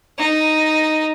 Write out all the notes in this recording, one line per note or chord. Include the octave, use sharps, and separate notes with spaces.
D#4